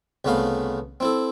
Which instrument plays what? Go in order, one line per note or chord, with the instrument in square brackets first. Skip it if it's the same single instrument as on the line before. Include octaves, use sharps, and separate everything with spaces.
[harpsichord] C2 C#3 A3 B3 F5 B5
C4 E4 A4